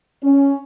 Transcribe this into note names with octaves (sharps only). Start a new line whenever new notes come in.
C#4